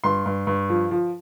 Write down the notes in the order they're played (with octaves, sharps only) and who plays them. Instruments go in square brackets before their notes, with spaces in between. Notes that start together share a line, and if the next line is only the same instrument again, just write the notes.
[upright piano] G2 C6
G2
G2
F3
F3